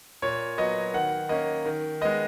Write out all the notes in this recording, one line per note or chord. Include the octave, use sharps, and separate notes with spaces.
A#2 C#5
F#3 B3 D#5
D#3 F#5
A#3 C#4 D#5
D#3
G#3 B3 D#5